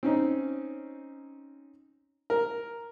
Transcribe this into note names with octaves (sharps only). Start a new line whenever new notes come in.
C4 C#4 D#4
A#4